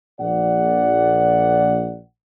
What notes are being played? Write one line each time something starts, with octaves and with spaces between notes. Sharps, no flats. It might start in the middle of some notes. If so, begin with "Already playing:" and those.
A#1 D5 F#5